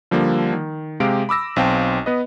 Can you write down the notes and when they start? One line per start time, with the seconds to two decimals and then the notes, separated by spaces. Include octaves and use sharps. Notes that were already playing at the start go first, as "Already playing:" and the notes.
0.11 D3 F3 G3 A#3
0.53 D#3
1.00 C3 G#3 G4 F5 D7
1.29 B5 D6 E6 A#6
1.56 B1 C4 F5 G5 A5
2.06 B3 B4 D#5